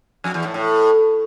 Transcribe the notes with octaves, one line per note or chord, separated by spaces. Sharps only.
F2
E2
A2
A2